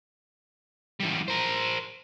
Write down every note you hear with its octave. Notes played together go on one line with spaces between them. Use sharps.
E2 G3
A#4 C5